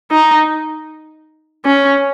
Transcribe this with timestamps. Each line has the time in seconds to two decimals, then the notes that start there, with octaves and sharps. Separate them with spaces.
0.11 D#4
1.65 C#4